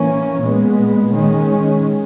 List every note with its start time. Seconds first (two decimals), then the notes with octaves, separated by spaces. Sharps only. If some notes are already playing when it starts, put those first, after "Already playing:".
Already playing: E3 A#3 C#4
0.41 A#2 G#3 B3
1.13 D#3 G#3 C#4